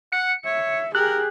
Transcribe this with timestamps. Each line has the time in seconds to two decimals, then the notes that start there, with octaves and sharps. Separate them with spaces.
0.12 F#5 C#7
0.46 C#5 E5
0.95 G4 G#4 A#4 F#6